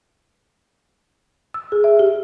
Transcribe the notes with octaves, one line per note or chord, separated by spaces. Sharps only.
E6
G#4
E5
G4